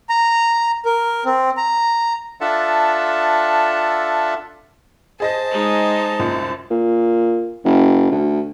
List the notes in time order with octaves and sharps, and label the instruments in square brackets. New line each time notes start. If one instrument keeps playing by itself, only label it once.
[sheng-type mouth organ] A#5
A#4
C4
A#5
[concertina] D4 F4 A4 E5 F#5 A5
[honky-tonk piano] G#4 D#5 A#6 [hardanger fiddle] C5 A5
[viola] G#3 D#4
[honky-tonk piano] C2 F#2 A#2
[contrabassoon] A#2
F#1
D2